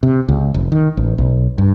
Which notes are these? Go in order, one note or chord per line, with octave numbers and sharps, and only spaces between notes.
C3
C#2
F1
D#3
A1
B1
G2